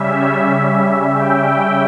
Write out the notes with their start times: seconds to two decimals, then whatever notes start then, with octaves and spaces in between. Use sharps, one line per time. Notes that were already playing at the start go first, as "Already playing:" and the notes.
Already playing: C#3 G3 C#4 E5
1.14 G5